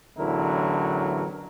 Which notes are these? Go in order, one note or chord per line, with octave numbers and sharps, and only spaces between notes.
A1 E2 D3 F#3 E4 A#4